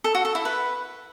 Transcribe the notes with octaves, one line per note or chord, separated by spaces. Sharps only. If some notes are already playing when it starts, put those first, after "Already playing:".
A4
F#4
A4
E4
B4